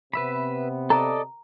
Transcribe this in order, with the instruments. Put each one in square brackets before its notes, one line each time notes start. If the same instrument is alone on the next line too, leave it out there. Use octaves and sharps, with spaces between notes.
[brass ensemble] C3 B3 [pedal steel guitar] B4 E5 B5
[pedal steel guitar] A4 D5 D#5 [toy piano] A#5